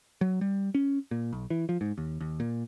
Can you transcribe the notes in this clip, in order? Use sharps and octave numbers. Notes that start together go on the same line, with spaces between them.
F#3
G3
C#4
A#2
B1
E3
F3
G#2
D#2
D#2
A#2